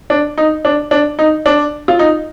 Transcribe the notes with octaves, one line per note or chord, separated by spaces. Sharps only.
D4
D#4
D4
D4
D#4
D4
F4
D#4